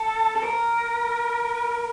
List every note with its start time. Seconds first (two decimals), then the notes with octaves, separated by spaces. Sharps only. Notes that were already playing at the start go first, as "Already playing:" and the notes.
Already playing: A4
0.36 A4
0.43 A#4